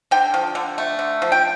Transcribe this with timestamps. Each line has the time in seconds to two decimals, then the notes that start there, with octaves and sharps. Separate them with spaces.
0.11 D3 G5
0.34 F3
0.55 D3
0.78 A3
0.99 D3
1.22 F3
1.32 G5